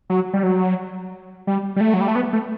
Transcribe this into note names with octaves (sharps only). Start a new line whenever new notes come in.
F#3
G3
F#3
G3
G3
A3
F#3
G3
A3
B3
A3